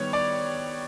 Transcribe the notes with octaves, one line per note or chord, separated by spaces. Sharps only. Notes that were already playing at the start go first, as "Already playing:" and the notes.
Already playing: D#3 G3 B3 C#5
D5